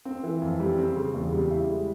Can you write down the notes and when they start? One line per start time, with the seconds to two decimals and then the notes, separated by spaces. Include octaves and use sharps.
0.05 C4
0.23 E3
0.42 F2
0.60 G3
0.78 C4
0.96 C#3
1.14 E2
1.32 G3
1.51 E4
1.69 G#3